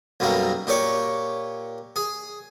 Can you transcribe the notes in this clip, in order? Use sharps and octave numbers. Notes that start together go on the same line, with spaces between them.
B1 F#2 B2 G3 A#3
A#2 G4 C#5 D5 C#6
G#4